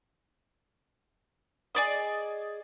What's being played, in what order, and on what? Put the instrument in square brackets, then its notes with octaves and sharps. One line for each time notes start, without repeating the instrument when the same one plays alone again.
[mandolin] G#4 D5 D#5